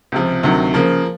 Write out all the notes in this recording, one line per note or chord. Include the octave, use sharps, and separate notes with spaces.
C#2 C3 F3
D2 C3 D#3 F#3
C#3 F3 A#3